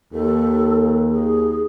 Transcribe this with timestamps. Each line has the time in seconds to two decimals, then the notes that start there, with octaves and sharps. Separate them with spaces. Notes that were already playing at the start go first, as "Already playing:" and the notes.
0.13 D#2 A4
1.11 G#4